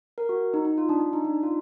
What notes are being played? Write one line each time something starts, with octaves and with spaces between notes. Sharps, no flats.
A#4
F#4
D#4
D#4
F4
D4
D4
D#4
D4
D#4
F4